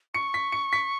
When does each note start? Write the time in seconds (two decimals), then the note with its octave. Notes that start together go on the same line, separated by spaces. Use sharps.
0.14 C#6 C#7
0.34 B6
0.52 C#7
0.73 B6